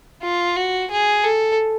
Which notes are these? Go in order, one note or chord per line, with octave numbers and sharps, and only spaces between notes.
F4
F#4
G#4
A4